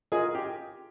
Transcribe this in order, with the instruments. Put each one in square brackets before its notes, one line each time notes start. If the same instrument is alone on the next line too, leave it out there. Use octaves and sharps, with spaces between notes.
[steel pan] F4 A#4 D#5 [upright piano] G#4
[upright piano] G4